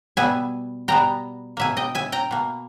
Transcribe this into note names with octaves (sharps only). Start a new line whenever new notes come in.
B2 G3 B3 E5 G#5
B2 G3 B3 G5 A#5
B2 A#3 E5 G#5
D#5 G5
E5 G#5
G5 A#5
B2 A#3